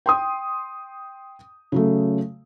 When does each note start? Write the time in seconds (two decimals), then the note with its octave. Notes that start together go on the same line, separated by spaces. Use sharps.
0.06 G5 C6 D#6
1.72 C#3 F#3 A3